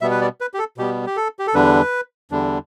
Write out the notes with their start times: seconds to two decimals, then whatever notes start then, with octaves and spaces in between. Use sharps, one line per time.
0.01 B2 G3 B3 E5
0.11 B4
0.21 D5
0.41 B4
0.54 G4
0.59 A4
0.78 B2 G3 B3 G4
1.07 G4
1.17 A4
1.39 G4
1.47 A4
1.54 E2 D3 G3 D4 B4
2.31 E2 D3 G3 D4